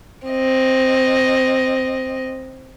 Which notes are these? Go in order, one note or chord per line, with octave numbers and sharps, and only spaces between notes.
C4 D#5